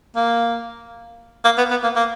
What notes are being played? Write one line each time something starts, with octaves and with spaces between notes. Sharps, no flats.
A#3
A#3
B3
B3
A#3
A#3